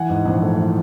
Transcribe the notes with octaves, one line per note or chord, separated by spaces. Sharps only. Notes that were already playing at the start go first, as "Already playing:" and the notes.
Already playing: E3 F#5 G#5
G#2
A#1
A3
E3